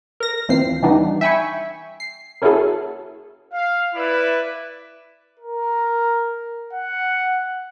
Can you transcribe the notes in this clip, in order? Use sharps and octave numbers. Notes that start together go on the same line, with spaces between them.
A#4 A#6
D#2 E3 F3 C4 C7
E3 G3 B3 D4 D#4
E5 G5 G#5 B5 C#6
C7
A#3 C#4 E4 F#4 G#4 A4
F5
E4 B4 D5 E5
A#4
F#5